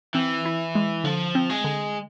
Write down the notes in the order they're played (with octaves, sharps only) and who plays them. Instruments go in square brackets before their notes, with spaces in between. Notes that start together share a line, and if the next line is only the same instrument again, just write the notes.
[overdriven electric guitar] E3 [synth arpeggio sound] C4
[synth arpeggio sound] E4
G#3
[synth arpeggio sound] D3 [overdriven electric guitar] F3
[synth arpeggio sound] C4
[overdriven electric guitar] G#3
[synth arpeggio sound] D3